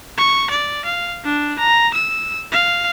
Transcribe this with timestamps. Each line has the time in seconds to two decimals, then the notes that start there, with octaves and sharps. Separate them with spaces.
0.17 C#6
0.50 D5
0.85 F5
1.24 D4
1.59 A#5
1.94 E6
2.52 F5